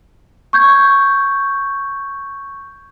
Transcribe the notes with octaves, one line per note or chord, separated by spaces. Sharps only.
C#6 G6 G#6